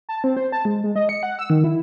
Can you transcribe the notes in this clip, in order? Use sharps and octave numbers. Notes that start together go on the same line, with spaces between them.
A5
C4
C5
A5
G#3
G#3
D#5
C#7
F#5
E6
D#3
E4